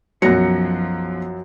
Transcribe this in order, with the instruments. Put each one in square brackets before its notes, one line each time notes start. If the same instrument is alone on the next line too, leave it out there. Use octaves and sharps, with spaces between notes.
[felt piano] B1 A#6 C#7 [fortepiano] F#2 F#3 [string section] F3